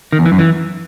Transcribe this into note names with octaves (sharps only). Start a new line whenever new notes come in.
D#3
E2
E3
F#2
E3